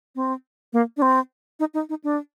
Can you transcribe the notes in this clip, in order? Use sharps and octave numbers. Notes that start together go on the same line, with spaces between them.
C4
A#3
D4
C4
D#4
D#4
D#4
D4